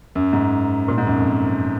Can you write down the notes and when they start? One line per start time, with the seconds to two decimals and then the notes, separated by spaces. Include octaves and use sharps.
0.15 F#2
0.33 G#2
0.88 A#2
0.98 G#2
1.07 F#2
1.16 F2